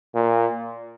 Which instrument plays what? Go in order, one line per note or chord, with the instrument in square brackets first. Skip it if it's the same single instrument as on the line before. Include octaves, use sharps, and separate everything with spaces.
[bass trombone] A#2